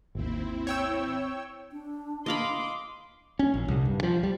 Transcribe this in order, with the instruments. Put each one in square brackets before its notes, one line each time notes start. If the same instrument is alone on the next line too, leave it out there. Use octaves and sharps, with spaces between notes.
[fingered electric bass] G#1 D#2 [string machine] C4 E4
[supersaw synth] C#5 G5 E6
[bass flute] D4
[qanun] D#5 F5 B5 [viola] C6 D6
[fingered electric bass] C#4
A#1
C2
G2
F3
G3